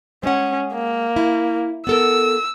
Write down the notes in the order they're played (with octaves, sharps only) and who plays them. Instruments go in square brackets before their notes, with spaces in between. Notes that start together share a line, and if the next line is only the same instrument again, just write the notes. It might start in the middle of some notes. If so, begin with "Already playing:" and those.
[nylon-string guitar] G#3 F#5 [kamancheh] C#4
[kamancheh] A#3
[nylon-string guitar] E4
[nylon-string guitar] B3 A4 A#4 [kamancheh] E6